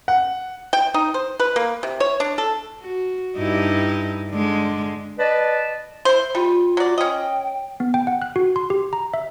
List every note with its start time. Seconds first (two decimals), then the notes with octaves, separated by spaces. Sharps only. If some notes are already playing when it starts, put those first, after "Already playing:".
0.08 F#5
0.73 G5
0.94 D#4
1.14 C5
1.40 B4
1.56 A#3
1.83 C3
2.00 C#5
2.20 D4
2.38 A4
2.81 F#4
3.37 G2 D#4 E4
4.30 D3 G#3
5.19 B4 D5 D#5 A5
6.05 E4 C5
6.35 G3 F4
6.77 F#3 D5
6.98 C#4 D#5 G5
7.80 B3
7.94 G5
8.07 F#5
8.22 F#6
8.36 F#4
8.56 C6
8.70 G4
8.93 A#5
9.14 E5